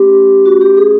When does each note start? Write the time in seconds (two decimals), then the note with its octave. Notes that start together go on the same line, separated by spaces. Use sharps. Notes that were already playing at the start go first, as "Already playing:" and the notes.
Already playing: A3 C#4 G4
0.46 F#4
0.61 G4
0.77 G#4